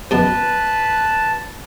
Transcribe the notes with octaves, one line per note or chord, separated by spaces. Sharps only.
F#2 B2 B4 A5